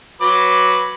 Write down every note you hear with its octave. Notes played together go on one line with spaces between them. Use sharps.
F#3 B4 D6